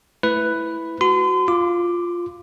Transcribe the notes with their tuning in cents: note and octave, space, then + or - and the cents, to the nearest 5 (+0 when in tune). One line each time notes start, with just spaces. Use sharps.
A3 +0 E4 +0 B4 +5
F#4 +0 C6 -40
F4 +0 D6 +5